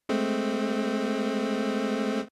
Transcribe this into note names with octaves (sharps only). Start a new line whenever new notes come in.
G#3 A3 C4